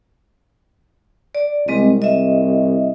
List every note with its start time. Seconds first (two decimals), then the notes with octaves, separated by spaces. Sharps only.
1.35 D5
1.68 C2 G#3 C4 D#5
2.02 D#5 E5